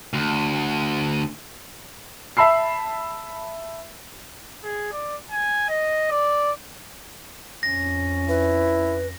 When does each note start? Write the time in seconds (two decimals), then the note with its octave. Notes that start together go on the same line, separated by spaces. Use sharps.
0.14 D2
2.37 E5 A5 B5 E6 C7
4.64 G#4
4.92 D5
5.31 G#5
5.69 D#5
6.11 D5
7.63 F2 C#4 A#6
8.29 E4 B4